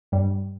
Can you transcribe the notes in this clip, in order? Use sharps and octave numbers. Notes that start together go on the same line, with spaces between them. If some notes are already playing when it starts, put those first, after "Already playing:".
G2 G3